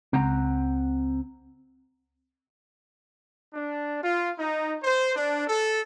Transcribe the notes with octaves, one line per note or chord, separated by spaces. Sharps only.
C#2 C4 F#5 A#5
D4
F4
D#4
C5
D4
A4